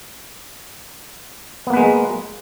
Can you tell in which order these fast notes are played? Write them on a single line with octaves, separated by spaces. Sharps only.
B3 A#3 B4 G#3